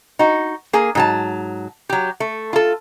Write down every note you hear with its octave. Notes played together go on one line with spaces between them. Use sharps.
D#4 F#4
A#3 G#4
G#2 F#3 A5
F#3 G4
A3
F4 A4